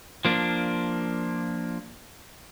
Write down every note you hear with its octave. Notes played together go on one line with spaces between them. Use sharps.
F3 A#3 D4